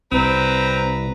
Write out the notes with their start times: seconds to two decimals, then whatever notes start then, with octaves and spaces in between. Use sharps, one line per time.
0.12 C2 C4 B4 A#5